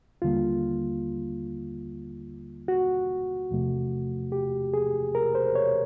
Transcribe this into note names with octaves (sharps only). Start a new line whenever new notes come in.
D#2 D3 G3 A#3 F4
F#4
E2 C3 F3 A3
G4
G#4
A#4
C5
C#5